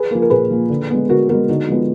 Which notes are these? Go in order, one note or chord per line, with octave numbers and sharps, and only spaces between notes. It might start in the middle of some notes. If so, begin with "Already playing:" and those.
Already playing: G#4 B4
F3 A#3
A#4
A#2 G#4 B4
F3 A#3
D3
G#3 B3
D3 F#4 A#4
G#3 B3 F#4 A#4
D3 D#4 F#4
F3 G#3 B3